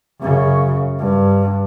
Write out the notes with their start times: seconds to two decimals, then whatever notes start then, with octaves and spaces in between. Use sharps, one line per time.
0.21 F#2 C#3
0.99 G2